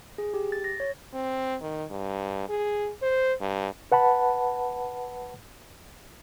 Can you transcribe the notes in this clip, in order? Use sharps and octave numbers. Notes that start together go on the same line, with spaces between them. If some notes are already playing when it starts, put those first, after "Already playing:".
G#4
G4
A6
A#6
C#5
C4
D#3
G2
G#4
C5
G2
B4 F#5 A5 B5